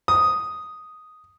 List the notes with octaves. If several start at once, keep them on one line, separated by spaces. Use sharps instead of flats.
D#6